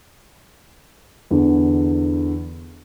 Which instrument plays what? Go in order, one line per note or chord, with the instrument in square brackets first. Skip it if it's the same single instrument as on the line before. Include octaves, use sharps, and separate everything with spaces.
[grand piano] E2 D3